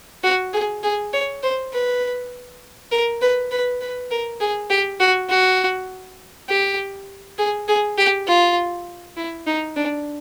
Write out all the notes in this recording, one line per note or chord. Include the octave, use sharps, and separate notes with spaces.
F#4
G#4
G#4
C#5
C5
B4
A#4
B4
B4
B4
A#4
G#4
G4
F#4
F#4
G4
G#4
G#4
G4
F4
E4
D#4
D4